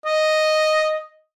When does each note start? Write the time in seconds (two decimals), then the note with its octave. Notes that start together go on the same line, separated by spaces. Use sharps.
0.06 D#5